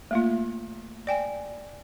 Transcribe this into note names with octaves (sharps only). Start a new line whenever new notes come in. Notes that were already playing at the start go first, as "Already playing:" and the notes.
A3 A#3 F4
D5 G5 G#5